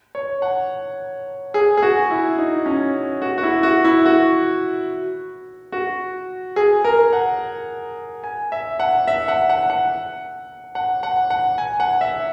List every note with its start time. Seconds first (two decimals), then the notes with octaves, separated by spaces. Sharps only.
0.15 C#5
0.42 F#5
1.54 G#4
1.77 G#4
1.82 F#4
2.11 E4
2.38 D#4
2.66 C#4
3.22 F#4
3.38 F#4
3.43 E4
3.63 F#4
3.85 E4
4.06 F#4
5.72 F#4
6.56 G#4
6.84 A#4
7.13 F#5
8.23 G#5
8.52 E5
8.80 F#5
9.07 E5
9.28 F#5
9.49 F#5
9.70 F#5
10.75 F#5
11.03 F#5
11.30 F#5
11.58 G#5
11.80 F#5
12.01 E5